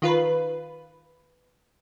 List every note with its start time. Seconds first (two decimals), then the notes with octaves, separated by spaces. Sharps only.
0.02 D#3 F4 B4